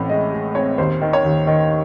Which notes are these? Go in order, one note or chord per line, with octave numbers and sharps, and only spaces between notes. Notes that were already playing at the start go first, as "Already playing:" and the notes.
Already playing: A1 A2 C4 C#5
G#3 D#5
G#3
C4 C#5
D#2 C5
D#3
C#5
D#2
D#3